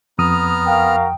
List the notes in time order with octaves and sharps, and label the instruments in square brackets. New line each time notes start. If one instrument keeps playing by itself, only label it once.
[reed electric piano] F2 D#6 [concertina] B3 A#5 F6
[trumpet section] F#4 A#4 F5 [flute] G5